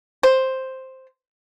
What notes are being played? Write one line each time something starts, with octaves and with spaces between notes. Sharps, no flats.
C5